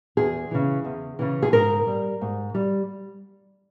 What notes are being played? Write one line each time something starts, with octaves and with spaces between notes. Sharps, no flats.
E2 G#4
C#3 E3
E2
C#3 E3
G#4
G#2 A#4
G3
G#2
G3